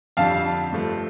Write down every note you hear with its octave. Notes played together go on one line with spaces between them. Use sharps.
F2 D3 G3 F5 A5
G2 F3 A3